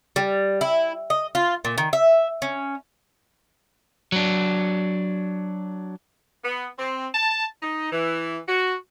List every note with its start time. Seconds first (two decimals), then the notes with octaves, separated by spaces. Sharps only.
0.16 G3
0.61 E4
1.10 D#5
1.35 F4
1.65 A#2
1.78 D#3
1.93 E5
2.42 C#4
4.12 F#3 D4
6.43 B3
6.78 C4
7.15 A5
7.62 D#4
7.92 E3
8.48 F#4